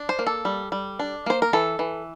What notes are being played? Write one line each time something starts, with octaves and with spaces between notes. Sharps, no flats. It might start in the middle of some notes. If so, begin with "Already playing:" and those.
Already playing: D4
C5
A#3
A4
G3
G3
D4
A#3 C5
A#4
E3 A4
E3